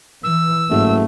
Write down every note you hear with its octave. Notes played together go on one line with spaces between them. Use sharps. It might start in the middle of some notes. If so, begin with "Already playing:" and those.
E3 E6
F#1 G#2 G#3 A3